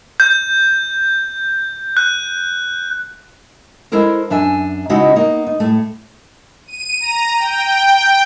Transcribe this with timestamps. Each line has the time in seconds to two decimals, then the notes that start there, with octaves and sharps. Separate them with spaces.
0.20 G6
1.97 F#6
3.92 G#3 E4 A4 A#4 C5
4.30 F#2 D4 E5 G#5
4.90 C#3 G#3 C4 D#4 E4 F#4
5.16 A#3 B3 D#4
5.47 D#4
5.60 A2 A3
6.67 D#7
7.00 A#5
7.37 G5